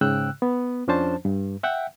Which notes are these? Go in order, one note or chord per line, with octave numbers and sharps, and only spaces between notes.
G#2 C#3 G5 E6 F#6
B3
F2 F3 C#4 D4 C5 A5
G2
E5 F#5 G5